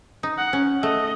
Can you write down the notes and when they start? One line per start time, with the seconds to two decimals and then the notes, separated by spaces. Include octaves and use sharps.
0.23 D#4
0.38 F#5
0.53 C#4
0.82 A3 D#5